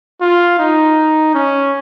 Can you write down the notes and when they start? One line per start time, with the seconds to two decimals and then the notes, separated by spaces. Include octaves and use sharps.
0.21 F4
0.59 D#4
1.34 C#4